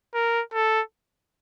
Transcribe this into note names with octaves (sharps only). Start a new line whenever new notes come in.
A#4
A4